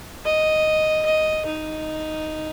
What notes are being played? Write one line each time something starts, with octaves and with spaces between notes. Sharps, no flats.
D#5
D#5
D#4